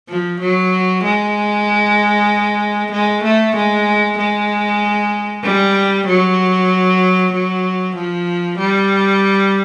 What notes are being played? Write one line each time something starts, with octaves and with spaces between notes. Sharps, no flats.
F3
F#3
G#3
G#3
A3
G#3
G#3
G3
F#3
F#3
F3
G3